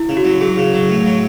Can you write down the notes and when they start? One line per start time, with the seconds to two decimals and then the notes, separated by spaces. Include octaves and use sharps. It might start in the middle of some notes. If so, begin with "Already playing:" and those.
Already playing: E4
0.09 C#3
0.17 F#4
0.25 F#3
0.41 F#3 G#4
0.57 C#3
0.74 F#3
0.89 A2
1.06 F#3